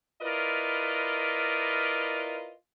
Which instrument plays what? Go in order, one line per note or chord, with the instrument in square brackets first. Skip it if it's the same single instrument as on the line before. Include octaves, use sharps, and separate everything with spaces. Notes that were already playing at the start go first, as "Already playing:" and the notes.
[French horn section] E4 F4 A#4 B4 D5 D#5